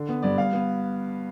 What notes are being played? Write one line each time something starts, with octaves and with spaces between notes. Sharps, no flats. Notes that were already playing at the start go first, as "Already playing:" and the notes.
Already playing: D3
B3
G2 D5
G2 F5
B3